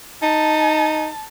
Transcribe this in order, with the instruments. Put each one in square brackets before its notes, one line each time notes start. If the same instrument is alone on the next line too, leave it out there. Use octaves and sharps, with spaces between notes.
[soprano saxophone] D#4 [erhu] A5